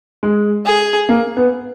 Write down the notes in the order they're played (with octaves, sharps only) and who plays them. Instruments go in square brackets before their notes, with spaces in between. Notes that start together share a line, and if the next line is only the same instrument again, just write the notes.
[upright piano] G#3
[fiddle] G#4
[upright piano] A#3
B3